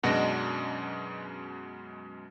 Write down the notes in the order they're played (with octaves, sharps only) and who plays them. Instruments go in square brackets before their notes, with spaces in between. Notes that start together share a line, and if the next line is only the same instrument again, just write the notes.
[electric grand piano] F#2 B2 G#3 [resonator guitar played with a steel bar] D4 D#5 F#5